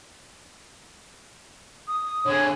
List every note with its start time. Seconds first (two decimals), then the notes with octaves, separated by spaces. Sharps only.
1.88 D#6
2.26 D3 G#4 C#5